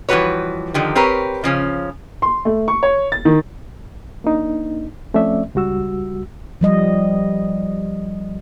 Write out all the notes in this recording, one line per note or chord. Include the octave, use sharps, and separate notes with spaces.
E3 F3 G3 F#4 B4 C#5
D3 D#3 F3 G4
C4 G4 A#4 B4 C#5
C#3 F3 C#4
C6
A3
C#6
C#5
A6
D#3
A#3 D4 D#4
F3 A3 C4 C#4 D5 E5
C#2 G3 F#4 E6
F3 G3 D#5